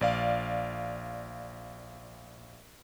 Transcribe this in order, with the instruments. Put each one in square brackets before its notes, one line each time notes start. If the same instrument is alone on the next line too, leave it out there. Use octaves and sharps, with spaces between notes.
[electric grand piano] A#1 D5 F5